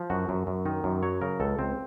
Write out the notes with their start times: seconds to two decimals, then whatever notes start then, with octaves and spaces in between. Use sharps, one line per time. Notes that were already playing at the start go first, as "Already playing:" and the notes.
Already playing: F3
0.10 F#2 F#4
0.29 F#2
0.47 F#2
0.66 D#3 D#4
0.84 F#2
1.03 F#3 C#5
1.21 C#3 A#4
1.40 C#2 A4
1.59 C#2 C4